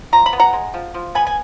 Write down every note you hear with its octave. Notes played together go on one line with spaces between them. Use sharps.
F3 A#5
B5
B3
F#5 A#5
G#3
F3
F3
B3 G#5 B5
G#5